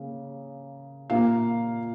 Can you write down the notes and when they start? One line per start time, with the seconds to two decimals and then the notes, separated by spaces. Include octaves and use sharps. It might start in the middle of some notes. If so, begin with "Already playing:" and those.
Already playing: C#3 A#3
1.10 A#2 A#3 F5